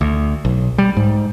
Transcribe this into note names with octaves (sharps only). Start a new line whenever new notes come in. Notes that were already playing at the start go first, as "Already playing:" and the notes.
D2
B1
G3
G#2